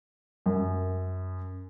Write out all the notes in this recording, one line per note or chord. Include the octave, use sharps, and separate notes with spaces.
F#2